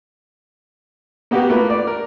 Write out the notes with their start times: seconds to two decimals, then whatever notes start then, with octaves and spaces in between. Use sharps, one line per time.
1.31 A#3 B3 F#4 G4 A#4 B4
1.50 A3 A#3 F4 A#4 B4
1.70 D5
1.87 A#4